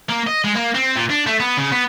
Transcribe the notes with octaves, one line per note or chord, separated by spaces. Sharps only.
A#3
D#5
G#3
A#3
C4
A#2
D4
A3
B3
C#3
B3